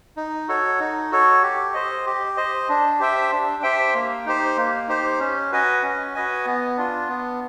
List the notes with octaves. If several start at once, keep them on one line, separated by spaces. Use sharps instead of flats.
D#4
F#4 A4 C#5
D#4
F#4 A4 C#5
G4
C5 D#5
G4
C5 D#5
D4
G4 C5 E5 G5
D4
G4 C5 E5 G5
A#3
D#4 G4 C5
A#3
D#4 G4 C5
C#4
F#4 B4 D#5 G#5
C#4
F#4 B4 D#5 G#5
B3
D4 F4
B3